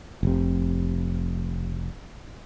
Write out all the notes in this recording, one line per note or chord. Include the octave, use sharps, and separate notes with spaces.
F1 C3